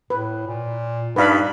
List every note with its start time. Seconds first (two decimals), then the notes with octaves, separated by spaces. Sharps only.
0.10 A2 B4
0.47 A#2
1.16 G2 D#4 B4 F5 B5